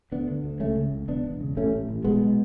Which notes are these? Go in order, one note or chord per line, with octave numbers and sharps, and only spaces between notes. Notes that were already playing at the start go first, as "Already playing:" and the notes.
D2 B3 D4
D3
D2
C#2 A3 C#4
C#3
C#2
E1 B3 D4
E1
C#3
A1 A3 C#4
A2
A1
B1 G#3 B3
B2